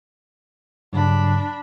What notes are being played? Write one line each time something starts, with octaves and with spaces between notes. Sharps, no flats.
G2 C#3 F#3 D4 B5